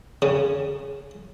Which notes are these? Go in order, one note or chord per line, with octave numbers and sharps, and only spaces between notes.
C#3